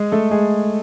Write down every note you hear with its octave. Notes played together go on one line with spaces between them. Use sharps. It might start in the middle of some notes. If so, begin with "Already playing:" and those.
Already playing: G#3 G#4
A3 A4
G#3 G#4